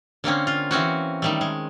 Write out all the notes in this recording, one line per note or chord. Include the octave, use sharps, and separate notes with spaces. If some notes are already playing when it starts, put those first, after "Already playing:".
D3 A#3 C4 C#4
F4
E3 C4 C#4 F#4
D#3 G3 A3
G#3